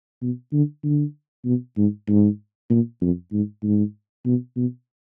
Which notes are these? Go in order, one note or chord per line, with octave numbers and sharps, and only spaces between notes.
B2
D3
D3
B2
G#2
G#2
A#2
F2
G#2
G#2
B2
B2